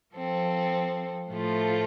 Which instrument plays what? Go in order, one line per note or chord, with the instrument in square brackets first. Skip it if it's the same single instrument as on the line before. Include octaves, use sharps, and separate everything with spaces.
[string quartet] F3 C4 A4
A2 F3 A3 F4